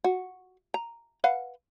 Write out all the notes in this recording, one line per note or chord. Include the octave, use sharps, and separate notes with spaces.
F#4
A#5
B4 F5 F#5